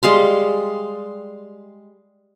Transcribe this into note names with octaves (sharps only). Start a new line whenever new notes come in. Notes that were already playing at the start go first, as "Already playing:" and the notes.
G3 G#3 F5 C6